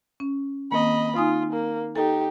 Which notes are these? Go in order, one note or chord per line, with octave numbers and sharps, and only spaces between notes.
C#4
D#3 A#3 C4 D#5 B5
D#4 F4 G#5 D#6
A#3
D#4 G4 A4